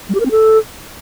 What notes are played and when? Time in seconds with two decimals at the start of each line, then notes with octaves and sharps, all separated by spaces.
0.09 G3
0.15 G4
0.20 A#4
0.26 C4
0.31 A4